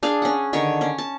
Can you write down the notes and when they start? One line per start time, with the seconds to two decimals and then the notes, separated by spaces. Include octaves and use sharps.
0.03 D4 G#4 F5
0.22 C#4 F#5
0.53 D3 D#3 C#5
0.81 C#4
0.98 A5